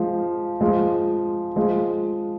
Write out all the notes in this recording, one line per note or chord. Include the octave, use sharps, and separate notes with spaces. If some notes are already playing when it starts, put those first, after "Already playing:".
Already playing: F3 G#3
F3 G#3
F3 G#3